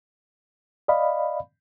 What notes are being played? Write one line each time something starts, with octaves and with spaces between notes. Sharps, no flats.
D5 D#5 F5 B5